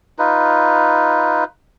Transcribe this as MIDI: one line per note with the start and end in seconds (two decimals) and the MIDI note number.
0.19 1.44 63
0.19 1.44 65
0.19 1.44 71